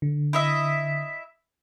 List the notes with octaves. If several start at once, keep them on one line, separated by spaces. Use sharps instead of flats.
D3
E4 D#5 E5